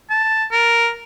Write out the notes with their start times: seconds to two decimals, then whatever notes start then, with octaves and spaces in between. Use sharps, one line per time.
0.10 A5
0.51 A#4